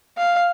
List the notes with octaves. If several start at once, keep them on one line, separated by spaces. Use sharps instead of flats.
F5